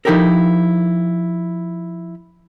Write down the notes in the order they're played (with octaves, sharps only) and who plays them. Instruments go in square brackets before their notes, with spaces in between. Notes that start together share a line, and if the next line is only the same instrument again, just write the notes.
[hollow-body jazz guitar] F3 D#4 E4 G4 A4 A#4